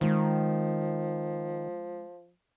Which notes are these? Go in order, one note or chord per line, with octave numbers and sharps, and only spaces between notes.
D#3 F3 G#3 C4